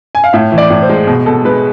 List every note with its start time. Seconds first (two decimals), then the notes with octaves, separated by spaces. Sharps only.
0.15 G#5
0.24 F5
0.33 A2 E5
0.52 E3
0.58 D5
0.70 A2
0.82 C5
0.90 G#3
1.07 B2
1.26 B2 A4
1.45 G#3 B4